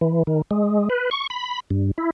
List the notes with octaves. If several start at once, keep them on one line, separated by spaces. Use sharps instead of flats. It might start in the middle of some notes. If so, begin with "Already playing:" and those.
E3
D#3
G#3
B4
C#6
B5
G2
E4